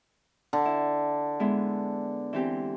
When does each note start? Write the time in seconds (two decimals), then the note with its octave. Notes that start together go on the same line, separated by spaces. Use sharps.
0.53 D3
0.65 E4
1.40 G#3 B3 E4
2.33 E3 C4 G4